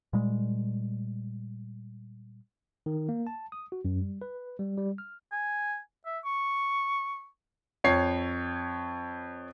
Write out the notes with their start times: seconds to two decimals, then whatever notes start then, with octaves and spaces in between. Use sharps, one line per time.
0.13 A#2 G3 G#3
2.86 D#3
3.09 A#3
3.27 A5
3.52 D#6
3.72 F#4
3.85 F#2
4.02 G3
4.22 B4
4.59 G3
4.77 G3
4.98 F6
5.32 G#5
6.06 E5
6.25 C#6
7.84 F2 C#5 C7